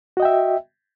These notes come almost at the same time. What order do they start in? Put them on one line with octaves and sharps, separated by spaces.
F#4 D#5 G5 E5